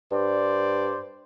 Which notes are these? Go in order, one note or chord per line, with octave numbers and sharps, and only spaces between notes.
G2 C5 D5